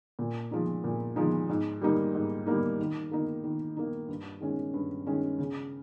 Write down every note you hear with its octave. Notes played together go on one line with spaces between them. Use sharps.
A#2
F3 G#3 D#4
A#2
F3 G#3 D#4
G#2
G3 A#3 D#4
G#2
G3 A#3 D#4
D#3
A#3 D#4
D#3
A#3 D#4
G2
D#3 G#3 C#4
G2
D#3 G#3 C#4
C#3